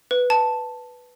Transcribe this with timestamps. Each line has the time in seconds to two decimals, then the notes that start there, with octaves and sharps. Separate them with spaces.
0.11 B4
0.30 A5